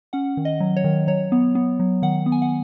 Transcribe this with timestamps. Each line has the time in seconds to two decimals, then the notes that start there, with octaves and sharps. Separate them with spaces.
0.13 C#4 F#5
0.37 D#3
0.45 D#5
0.60 F#3
0.76 C#5
0.84 D#3
1.08 F#3 C#5
1.32 B3
1.55 B3
1.80 F#3
2.02 D#3 F#5
2.26 B3
2.32 G#5
2.42 F#5